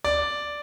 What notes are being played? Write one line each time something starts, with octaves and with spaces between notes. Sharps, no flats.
D5